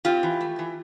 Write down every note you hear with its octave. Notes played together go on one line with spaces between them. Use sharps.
C4 F4 G4
E3
A3
E3